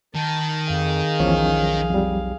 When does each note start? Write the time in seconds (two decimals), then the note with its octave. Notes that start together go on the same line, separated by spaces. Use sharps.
0.14 D#3 A5
0.70 F2 G#4 F5
1.20 B1 E2 F3 C#4
1.90 F2 G3